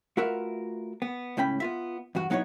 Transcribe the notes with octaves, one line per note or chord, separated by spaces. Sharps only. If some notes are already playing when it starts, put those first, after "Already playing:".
A3 F4 F#4 A#4 B4 E5
B3
C#2 A2 C#4 G5 B5
B3 F4 E5
E2 G2 F#4
F#3 B3 D#4 E4 C5 C#5